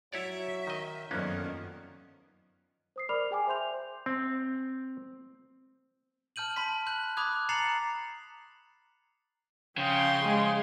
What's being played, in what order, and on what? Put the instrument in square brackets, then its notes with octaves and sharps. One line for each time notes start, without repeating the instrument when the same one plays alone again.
[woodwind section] F#3 [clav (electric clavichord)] E4 C#5 D5 [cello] E5
[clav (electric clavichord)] D#3 D#5
[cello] F#2 D#3 [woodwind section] D3 F3 [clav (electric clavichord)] A#3 B3 C#4
[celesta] C5 D#6 C7
A#4 D5 B5 D6 F6 F7
G#4 G5 G#5 D6
C5 E5 C6 G6 F7
[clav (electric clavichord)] C4
[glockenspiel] A5 F6 G6 D#7 F#7
A5 B5 C6 B6
F#6 G6 F#7
B5 D6 D#6 F#6 G#6
A#5 A6 C7 C#7 F7 F#7
[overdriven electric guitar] C#3 [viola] F3 C6 [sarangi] G5
[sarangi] G#3